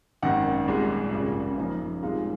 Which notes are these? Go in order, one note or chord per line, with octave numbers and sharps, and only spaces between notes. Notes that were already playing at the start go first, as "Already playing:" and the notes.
G#1 F#2 D#3 F#5
C2 A#2 G#3
G#1 F#2 C#3
F#2 F3 A#3 D#4
C2 A#2 G#3 D#4 F5